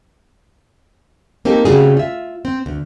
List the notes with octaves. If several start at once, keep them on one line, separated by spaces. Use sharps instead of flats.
A#3 C4 D#4 G4 A4
C#3 G3 A3 C4 F#4 G#4
F4 E5
C4
D2